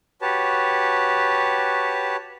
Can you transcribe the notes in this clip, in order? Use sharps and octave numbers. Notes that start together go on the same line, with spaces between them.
F#4 G4 B4 C#5 A5